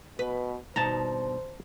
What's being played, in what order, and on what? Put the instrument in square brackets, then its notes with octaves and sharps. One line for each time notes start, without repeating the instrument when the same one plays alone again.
[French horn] B2 [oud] B4
[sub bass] G#1 [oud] G2 B2 D#4 [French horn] C5 [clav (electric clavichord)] A5 A#5